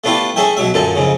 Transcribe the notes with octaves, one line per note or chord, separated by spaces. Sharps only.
A3 B3 D4 E4 F4 G4
C#4 G#4 A4 E5 G5
B1 B2 F#3 E5
F#2 A#2 D3 A4
F2 G#2 C#3